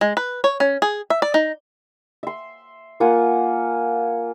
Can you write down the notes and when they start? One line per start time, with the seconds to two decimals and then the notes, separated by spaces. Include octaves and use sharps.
0.01 G#3
0.17 B4
0.44 C#5
0.60 C#4
0.82 G#4
1.10 E5
1.22 D5
1.34 D#4
2.23 E5 C6
3.00 A#3 F4 F#5 G#5